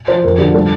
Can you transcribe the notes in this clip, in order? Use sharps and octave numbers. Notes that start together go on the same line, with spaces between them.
F3 C5
F2 A#4
D3 G4
G3 A4